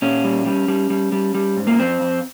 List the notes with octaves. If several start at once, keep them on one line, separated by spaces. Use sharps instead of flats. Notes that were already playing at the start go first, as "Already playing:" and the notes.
A#2 C#4
G3
G3
G3
G3
G3
G3
G#2
A#3
F2 C4
F2